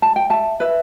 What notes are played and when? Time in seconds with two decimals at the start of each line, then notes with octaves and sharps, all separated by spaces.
0.02 A5
0.16 G5
0.30 E5 A5
0.60 B4 E5